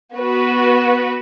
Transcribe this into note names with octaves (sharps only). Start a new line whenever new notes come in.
B3 F#4 B4